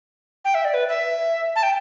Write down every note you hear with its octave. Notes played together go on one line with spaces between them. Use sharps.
G5
E5
D5
B4
E5
A5
G5